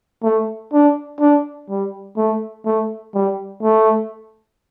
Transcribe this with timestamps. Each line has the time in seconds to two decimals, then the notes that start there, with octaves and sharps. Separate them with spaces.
0.24 A3
0.73 D4
1.20 D4
1.70 G3
2.17 A3
2.65 A3
3.14 G3
3.63 A3